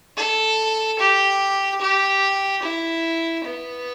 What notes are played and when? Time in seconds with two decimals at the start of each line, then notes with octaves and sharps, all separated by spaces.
0.16 A4
0.99 G4
1.81 G4
2.63 E4
3.45 B3